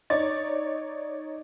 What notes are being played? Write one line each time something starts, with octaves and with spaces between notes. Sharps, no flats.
D#4 C#5 D5 A6